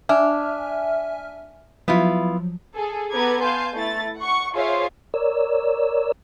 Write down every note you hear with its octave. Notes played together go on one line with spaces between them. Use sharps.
D4 E5 G#5 F6
F3 F#3 B3 E4 F4
G#4 A4
B3 A4 B4 A#5 D6 G#6
F5 G#5 A5 C6 G6
A3 E4 A6
F#5 C#6
F4 G#4 C5 C#5 E5 F5
A#4 C#5 D5 E6